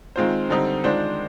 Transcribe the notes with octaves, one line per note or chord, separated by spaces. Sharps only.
D#3 G#3 C4 F4 C5
D3 G3 C4 D#4
D#3 G#3 D4 F4 C5